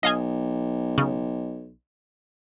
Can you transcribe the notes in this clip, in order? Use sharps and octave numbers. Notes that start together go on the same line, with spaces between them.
B1 D#5 F5 G#5
C#3